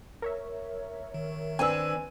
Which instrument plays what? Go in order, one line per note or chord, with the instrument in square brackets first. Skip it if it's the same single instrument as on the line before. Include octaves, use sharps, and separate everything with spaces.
[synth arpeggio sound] A#4 C#5 E5
[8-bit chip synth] D#3
[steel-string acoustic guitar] C4 D4 B4 [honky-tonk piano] G#5 E6